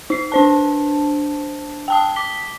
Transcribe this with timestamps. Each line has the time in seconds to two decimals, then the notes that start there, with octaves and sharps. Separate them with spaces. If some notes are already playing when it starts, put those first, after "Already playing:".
0.10 D#4 C7
0.32 D4 C5 A5
1.88 G5 A5 D#6
2.16 D6 B6 G7